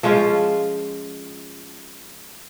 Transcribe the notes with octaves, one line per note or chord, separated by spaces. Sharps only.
F3 G#3 C#4 F4